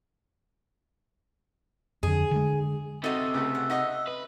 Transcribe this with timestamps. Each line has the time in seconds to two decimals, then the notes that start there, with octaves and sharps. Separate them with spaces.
2.03 F2 D3 G#4
2.31 D3 G#3
3.04 C3 D#4 F#4 A4 D#5 E5
3.34 C#2 C#3 A3
3.55 F#5
3.70 D#4 D#5 F#5
4.07 B4